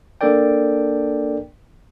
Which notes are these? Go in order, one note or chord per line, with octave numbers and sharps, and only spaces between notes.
A#3 D4 A4 A#4 D5 G5